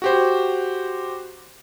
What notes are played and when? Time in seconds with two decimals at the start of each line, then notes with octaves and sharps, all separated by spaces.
0.02 F#4 G4 C5